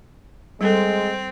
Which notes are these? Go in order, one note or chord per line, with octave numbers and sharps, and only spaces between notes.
G3 G#3 C4 A4